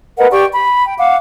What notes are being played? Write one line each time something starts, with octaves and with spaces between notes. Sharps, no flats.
A#4 B4 D#5 F#5
G4 D5 G5 C#6
B5
G5
F5 F#5 D6